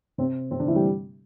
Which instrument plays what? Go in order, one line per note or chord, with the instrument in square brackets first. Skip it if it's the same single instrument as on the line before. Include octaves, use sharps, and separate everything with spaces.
[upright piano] C3 C4
C3 C4
D3 D4
E3 E4
G3 G4